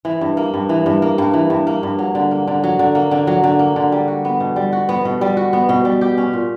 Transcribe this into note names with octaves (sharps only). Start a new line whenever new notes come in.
E3
G2
A#3
G2
E3
G2
A#3
G2
E3
G2
A#3
G2
F#3
D3
A#3
D3
F#3
D3
A#3
D3
F#3
D3
A#3
D3
G3
F#4
B3
B2
G3
F#4
B3
B2
G3
F#4
B3
B2
G3
G4
C#4
A#2